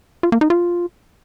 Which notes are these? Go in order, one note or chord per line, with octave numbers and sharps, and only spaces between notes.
F4
A#3
D#4
F4